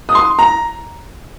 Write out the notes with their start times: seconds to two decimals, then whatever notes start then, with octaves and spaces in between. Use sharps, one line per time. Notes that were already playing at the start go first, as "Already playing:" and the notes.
0.09 D#6
0.15 C6
0.39 A#5